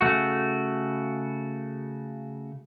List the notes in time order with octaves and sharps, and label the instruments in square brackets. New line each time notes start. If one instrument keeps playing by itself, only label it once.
[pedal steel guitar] C#3 A3 F#4